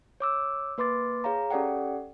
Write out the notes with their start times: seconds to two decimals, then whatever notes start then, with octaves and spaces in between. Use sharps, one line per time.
0.20 C#5 D6 E6
0.78 A#3 B4 C6 D6 A6
1.24 G#4 C#5 F5 A#5
1.50 C#4 G4 A4 D5 F#5 G5